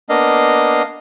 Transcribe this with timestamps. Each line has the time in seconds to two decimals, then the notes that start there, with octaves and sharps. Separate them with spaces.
0.09 A#3 B3 D4 D#5 F5